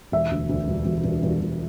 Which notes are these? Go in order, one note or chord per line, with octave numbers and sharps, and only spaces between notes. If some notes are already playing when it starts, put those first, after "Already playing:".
E1 E5
D2
D2
E1
E1
E1
E1
E1